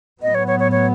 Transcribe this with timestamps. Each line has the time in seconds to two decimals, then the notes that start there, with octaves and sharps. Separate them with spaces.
0.22 A2 F#3 B3 D#5
0.35 C#5
0.47 C#5
0.60 C#5
0.72 C#5